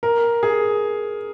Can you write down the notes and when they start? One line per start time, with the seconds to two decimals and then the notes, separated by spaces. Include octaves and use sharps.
0.03 A#4
0.43 G#4